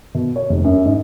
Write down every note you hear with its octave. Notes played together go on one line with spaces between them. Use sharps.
B2
C#5
F1
F#2
G#2